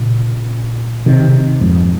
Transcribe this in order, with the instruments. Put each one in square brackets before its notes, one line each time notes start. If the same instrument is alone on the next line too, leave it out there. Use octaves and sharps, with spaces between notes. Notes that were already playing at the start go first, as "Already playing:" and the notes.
Already playing: [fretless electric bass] A#2 C#3
C3 D#3
F2 G#2